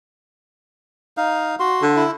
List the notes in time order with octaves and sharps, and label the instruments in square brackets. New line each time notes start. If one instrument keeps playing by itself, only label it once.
[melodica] D#4 F5
F#4 C6
[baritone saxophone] D3
[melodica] E4